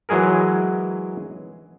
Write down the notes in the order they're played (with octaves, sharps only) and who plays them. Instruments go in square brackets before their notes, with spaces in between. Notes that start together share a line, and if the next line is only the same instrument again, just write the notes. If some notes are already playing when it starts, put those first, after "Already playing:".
[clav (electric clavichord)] E3 F#3 G#3 G#4 A#4